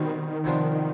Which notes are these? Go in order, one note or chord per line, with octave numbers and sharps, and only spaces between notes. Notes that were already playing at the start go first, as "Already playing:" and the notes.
Already playing: B2 D#3 G3 C4
C3 F3 B3 D4 F4